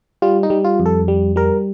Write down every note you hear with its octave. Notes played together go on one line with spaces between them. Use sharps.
G3 F4
D#4
G3
F4
F2
A4
G3
G3 A#4